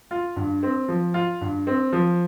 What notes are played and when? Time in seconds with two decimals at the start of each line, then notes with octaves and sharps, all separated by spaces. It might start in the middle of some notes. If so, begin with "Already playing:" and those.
0.11 F4
0.36 G2
0.63 C4
0.88 F3
1.14 F4
1.41 G2
1.67 C4
1.93 F3